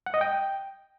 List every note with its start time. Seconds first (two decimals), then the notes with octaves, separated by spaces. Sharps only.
0.06 F#5
0.14 D#5
0.21 G5